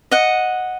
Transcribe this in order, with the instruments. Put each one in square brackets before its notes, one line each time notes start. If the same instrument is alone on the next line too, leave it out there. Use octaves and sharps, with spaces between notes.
[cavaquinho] D#5 F#5